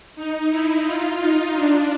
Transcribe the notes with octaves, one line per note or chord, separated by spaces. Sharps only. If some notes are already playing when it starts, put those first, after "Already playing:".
D#4
E4
F4
D#4
D4